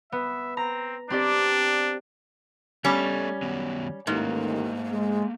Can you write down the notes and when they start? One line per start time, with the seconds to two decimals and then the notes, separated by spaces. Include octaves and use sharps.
0.12 B3 E5
0.57 C4 A#5
1.10 C4 D4 G4 D5
2.85 G3 A3 B3 C#4 A4
3.42 D#3 F#3 B3
4.07 A1 D#2 G#2 D#3 A3 A#3
4.92 G#3